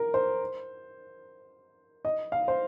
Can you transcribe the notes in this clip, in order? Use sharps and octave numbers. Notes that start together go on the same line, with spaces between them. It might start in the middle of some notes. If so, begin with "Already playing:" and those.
Already playing: A#4
C5
D#5
F5
C5